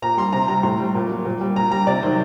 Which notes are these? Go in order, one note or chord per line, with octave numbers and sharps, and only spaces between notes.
A#2 A#5
G3 C6
C3 A#5
G3 A#5
A2 C6
G3
A#2
F#3
A#2
G3
A#2 A#5
G3 A#5
C3 D5
D#3 F#3 C5